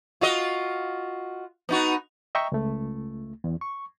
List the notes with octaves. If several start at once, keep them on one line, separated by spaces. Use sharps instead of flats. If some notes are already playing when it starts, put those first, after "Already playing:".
F4 F#4 D#5
B3 D#4 F#4
D#5 E5 G5 A#5 C#6
C#2 A3
E2
C#6